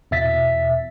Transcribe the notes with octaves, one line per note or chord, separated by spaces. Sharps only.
E2 B2 E5 A6 B6